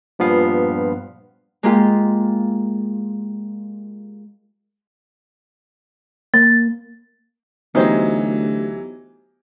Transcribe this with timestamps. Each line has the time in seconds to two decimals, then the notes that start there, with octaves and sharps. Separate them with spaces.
0.19 G2 A#2 F3 B3 F5
1.63 G#3 A#3 F4 G4
6.34 A#3 A6
7.75 D2 E3 F#3 B3 D#4 G4 C5